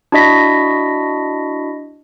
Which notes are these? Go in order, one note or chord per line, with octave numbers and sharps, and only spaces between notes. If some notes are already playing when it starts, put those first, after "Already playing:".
D4 E4 F#4 D#5 A#6 B6